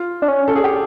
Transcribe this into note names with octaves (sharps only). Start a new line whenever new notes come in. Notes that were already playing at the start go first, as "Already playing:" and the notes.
Already playing: F4
D4
C#4
A4
G#4
G4